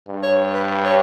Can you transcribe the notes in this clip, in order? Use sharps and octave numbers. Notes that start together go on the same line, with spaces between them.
G2
C#5
B4
C#5